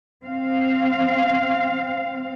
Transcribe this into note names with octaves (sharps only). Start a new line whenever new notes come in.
C4 F5